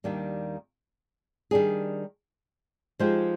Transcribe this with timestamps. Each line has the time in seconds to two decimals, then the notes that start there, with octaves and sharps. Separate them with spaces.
0.04 D#2 D#3 G3 A#3 D4
1.51 D#3 G3 D4 G#4
3.00 F3 G#3 D#4 G4 C5